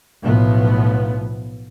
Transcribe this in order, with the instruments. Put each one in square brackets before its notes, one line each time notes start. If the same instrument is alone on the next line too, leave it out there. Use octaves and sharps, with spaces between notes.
[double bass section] B1 A2 F3 B3